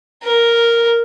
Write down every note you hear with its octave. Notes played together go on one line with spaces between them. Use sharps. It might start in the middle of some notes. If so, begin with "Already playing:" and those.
A#4